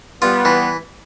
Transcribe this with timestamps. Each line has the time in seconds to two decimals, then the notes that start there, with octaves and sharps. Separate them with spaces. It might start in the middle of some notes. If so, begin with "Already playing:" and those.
0.22 G3 B3 F4
0.45 E3